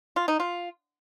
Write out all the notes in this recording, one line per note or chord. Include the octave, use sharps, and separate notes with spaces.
F4
D#4
F4